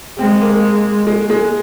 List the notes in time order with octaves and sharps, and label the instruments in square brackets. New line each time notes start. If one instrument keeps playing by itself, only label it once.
[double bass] G#3 [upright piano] C4
[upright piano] A#3
G#3
G#3